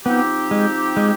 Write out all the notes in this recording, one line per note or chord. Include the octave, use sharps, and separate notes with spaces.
F3 B3 C4 D#4 G4
G#3
G#3